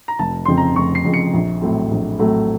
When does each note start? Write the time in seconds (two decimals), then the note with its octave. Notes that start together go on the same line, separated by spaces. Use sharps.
0.08 A#5
0.19 F1 A5
0.45 F2 C#3 F3 C4 C6
0.57 A#5
0.76 F1 C#6
0.95 C7
1.05 F2 C#3 F3 C4
1.14 C#7
1.34 A#1
1.61 A2 F#3 A3 C4
1.91 A#1
2.19 A2 F#3 A3 C4